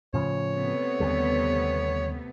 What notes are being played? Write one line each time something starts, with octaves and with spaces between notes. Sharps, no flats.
A2 C#3 F3 C#5
C3 A3 B3
D#2 D3 G3